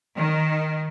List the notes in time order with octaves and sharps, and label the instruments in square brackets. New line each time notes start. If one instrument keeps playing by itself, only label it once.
[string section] D#3